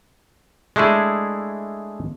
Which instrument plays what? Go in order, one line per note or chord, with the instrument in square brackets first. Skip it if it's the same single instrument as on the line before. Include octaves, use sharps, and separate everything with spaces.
[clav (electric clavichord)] G#3 A3 D4 E4 G#4